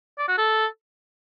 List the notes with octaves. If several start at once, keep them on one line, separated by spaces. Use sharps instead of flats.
D5
F#4
A4